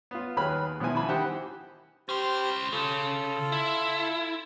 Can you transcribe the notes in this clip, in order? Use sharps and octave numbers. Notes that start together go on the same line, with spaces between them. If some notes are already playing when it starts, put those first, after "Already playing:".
B3 F4
D#2 F#3 G#4 B4 B5 F6
B2 F3 B3 E4 G#5
E3 E4 G#5 A5 B5
D#3 E3 G4 C5 F#5
C#4 G4 C5 C6 F6
C#3 F4 A4
E4